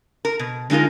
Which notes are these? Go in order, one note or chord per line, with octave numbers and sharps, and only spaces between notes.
A#4
B2
D3 G#3 D#4 F4 A#4